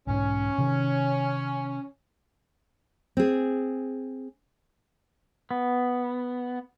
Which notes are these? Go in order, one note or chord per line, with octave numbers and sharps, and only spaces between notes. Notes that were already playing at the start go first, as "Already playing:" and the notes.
B1 G#2 C#4
C3 D#3
C4 G#4
B3